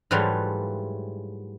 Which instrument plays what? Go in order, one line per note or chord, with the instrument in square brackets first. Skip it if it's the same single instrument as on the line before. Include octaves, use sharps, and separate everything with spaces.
[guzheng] G#2 E3 F#3 G3 A3 F4